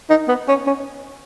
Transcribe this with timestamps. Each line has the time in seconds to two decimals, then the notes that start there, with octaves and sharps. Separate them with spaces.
0.10 D#4
0.28 B3
0.48 C#4
0.67 C#4